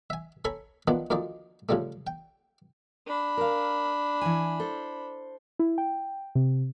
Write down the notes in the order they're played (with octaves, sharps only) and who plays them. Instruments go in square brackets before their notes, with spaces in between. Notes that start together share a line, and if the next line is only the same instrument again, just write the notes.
[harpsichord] E5 G#5
A4 C#5 G#5 A#5 B5 C#6
D#3 F3 B3 D4
D2 D#3 F3 D#4 D5
A2 C#3 F3 G3 A3
G5
[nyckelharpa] D4 B5
[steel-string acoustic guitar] A#4 F5
E3 G#5
A4 C5
[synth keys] E4
G5
C3